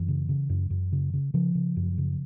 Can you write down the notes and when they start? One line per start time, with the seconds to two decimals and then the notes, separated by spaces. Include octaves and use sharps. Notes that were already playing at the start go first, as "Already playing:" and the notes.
Already playing: F#2 E3
0.08 C#3
0.29 C#3
0.49 F#2
0.70 F#2
0.92 C#3
1.14 C#3
1.34 C#3 F3
1.55 C#3
1.76 F#2
1.98 C#3